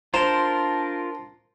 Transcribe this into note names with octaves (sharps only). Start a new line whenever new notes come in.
D4 F4 A#4 C5 A#5 E7